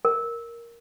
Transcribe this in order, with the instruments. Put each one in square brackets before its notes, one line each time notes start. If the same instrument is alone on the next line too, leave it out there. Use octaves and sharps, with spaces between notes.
[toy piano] A#4